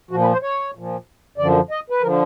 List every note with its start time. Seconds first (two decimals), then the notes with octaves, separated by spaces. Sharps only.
0.11 A#2 F3 F#4
0.21 B4
0.32 C5
0.42 C#5
0.75 A#2 F3
1.37 F#2 D3 F3 D5
1.71 D#5
1.90 B4
2.02 D3 F3 A#4